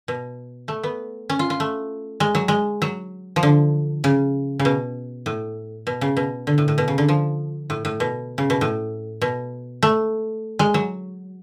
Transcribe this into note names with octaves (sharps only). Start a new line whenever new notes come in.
B2
A3
B3
C#4
F4
F4
A3
G#3
F#3
G#3
F#3
F3
D3
C#3
C#3
B2
A2
B2
C#3
B2
D3
A2
A2
B2
C#3
D3
F3
A2
A2
B2
C#3
B2
A2
B2
A3
G#3
F#3